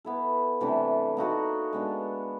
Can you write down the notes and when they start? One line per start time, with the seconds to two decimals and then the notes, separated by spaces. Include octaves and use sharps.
0.05 B3 E4 A4
0.61 C3 E3 A3 D4
1.17 A#3 D#4 F#4 A4
1.73 G#3 B3 D4